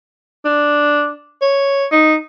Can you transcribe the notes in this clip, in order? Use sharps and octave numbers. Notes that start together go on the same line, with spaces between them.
D4
C#5
D#4